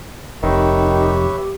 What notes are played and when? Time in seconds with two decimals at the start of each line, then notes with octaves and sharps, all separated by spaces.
0.42 F1 D#3 G4 B4 C#5 E5